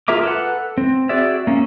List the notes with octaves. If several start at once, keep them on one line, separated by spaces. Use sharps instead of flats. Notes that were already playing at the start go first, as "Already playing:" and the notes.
F4 G#4 A#4 E5 D6
A4 B4 F#5
C4
F#4 G#4 D5 E5
A#3 C#4